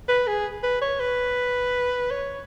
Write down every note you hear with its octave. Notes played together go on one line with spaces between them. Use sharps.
B4
G#4
B4
C#5
B4
C#5